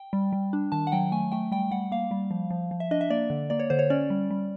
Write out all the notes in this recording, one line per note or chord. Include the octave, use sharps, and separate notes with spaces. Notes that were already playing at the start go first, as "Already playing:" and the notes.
Already playing: G5
G3
G3
D4
D#3 A5
F#5
F#3 G5
A3 G#5
A3 G5
G3 G5
G3 F#5
A#3 F5
G3
F3
F3
F3
E5
D4 D#5
E5
A#3 D5
D3
A#3 D5
C#5
D3 C5
C#5
C#4 D5
G3
G3